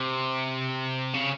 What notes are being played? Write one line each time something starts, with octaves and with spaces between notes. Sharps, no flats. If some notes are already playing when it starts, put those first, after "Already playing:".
Already playing: C3
C#3